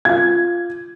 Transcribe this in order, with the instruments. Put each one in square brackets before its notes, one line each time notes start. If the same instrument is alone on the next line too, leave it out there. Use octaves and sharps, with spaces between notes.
[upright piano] F4 F5 G#6